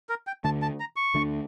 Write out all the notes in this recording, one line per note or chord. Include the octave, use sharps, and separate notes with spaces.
A#4
G5
D2 D3 A3 D4 A5
A5
A#5
C#6
D2 D3 A3 D4